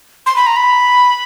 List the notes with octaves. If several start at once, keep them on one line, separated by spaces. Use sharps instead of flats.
C6
B5
A#5
B5